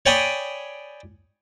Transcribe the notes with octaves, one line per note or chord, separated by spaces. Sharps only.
C#5 D5 G5 G#5 B5 D#6